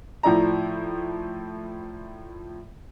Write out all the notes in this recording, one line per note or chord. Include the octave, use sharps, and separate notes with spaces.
A2 F3 E4 D5 A#5